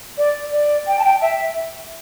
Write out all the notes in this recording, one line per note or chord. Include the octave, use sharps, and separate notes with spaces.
D5
D5
G5
A5
G5
E5